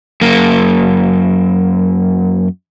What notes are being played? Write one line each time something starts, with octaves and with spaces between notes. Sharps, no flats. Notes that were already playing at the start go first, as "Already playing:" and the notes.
F#2 A#3